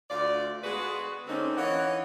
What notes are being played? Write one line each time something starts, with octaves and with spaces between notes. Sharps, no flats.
D2 F4 D5
G#3 B3 F#4 G#4 B4
D3 A#3 C4 C#4 D#4
E3 C#5 D#5 F5 F#5